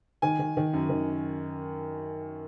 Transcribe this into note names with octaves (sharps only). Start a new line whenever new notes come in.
D#3 G#5
D#3
D#3
F#2
D#3